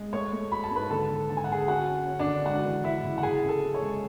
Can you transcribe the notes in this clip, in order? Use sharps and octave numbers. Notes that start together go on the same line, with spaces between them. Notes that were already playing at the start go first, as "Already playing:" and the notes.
Already playing: G#3
A3 C#5 C#6
A3
F#3 B5
A5
G#2 B4 B5
D3 A4 A5
D3
D3 A5
G#5
F#5
D3 G#4 G#5
C#4 F#4 F#5
C#4
C#4
D4 D5
D3
G#3 F#4 F#5
E3
E3 E4 E5
C#3
F#5
F#2 G#4 G#5
F#2
A4 A5
C#4
C#5
G#3